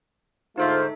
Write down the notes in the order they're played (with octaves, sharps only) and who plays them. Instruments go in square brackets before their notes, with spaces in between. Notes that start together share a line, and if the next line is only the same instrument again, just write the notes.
[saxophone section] G#2 D3 A3 [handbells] D#4 A4 E5 [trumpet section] F4 [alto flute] C5